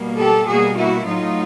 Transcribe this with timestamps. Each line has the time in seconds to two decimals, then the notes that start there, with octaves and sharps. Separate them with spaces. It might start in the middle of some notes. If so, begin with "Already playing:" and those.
Already playing: B2 G3 A#3
0.17 G4 A4
0.47 B2 G3 A#3 F#4 G#4
0.76 E4 F#4
1.05 A2 F#3 A3 D#4 F4